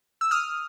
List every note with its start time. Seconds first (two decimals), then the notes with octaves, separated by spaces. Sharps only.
0.21 E6
0.31 D#6 F6